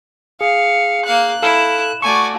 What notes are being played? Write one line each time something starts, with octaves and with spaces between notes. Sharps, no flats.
G#4 F5 C#7
A#3 F5 F#6
E4 A4 F5 E7
A3 F#4 D5 G#5 C#6